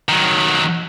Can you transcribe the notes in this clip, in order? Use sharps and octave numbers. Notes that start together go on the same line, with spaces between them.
D#3 F#3